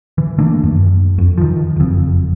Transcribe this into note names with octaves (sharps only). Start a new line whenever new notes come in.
E3
D#3 A3 A#3 D4
F#2
F2
D#3 F3
F#1 F2